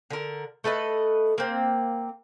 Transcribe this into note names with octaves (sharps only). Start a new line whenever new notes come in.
D3 A#4
A3 A4 B4 D#5
A#3 C4